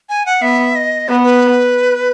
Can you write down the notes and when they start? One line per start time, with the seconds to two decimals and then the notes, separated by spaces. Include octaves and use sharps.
0.09 G#5
0.26 F#5
0.42 B3 E5
0.75 D#5
1.08 B3 B4
1.23 B4